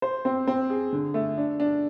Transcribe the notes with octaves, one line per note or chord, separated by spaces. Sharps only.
C5
C4
C4
G#4
D3
A3
D4
D4